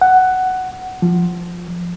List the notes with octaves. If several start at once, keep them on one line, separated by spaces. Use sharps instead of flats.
F#5
F3